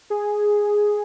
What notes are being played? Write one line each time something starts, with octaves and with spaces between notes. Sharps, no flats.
G#4